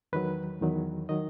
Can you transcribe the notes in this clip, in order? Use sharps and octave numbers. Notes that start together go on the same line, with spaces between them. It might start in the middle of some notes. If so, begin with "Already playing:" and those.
E2 D#3 F#3 B4
E2 D#3 F#3
D#3 F#3 D#5